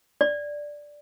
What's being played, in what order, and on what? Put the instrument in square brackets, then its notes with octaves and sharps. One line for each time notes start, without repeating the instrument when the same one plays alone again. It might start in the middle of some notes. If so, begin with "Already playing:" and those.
[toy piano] D5